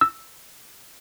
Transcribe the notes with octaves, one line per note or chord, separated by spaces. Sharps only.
E6